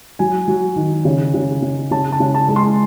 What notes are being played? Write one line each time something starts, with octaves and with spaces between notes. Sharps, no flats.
F#3 G#5
F#3
D#3
C#3
C#3
C#3
C#3 A5
A5
C#3
A5
G#3
C6